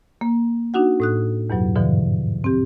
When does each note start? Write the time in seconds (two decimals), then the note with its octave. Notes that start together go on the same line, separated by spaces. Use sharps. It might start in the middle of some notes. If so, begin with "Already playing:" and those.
0.21 A#3
0.74 D4 D#4 F#4 F#5
1.00 A2 D#6 F#6
1.50 E2 G2 B2 F#3
1.76 G#2 B2 D3 E3 F3
2.44 C4 G4